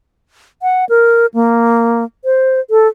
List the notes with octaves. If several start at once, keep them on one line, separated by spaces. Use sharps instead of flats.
F#5
A#4
A#3
C5
A4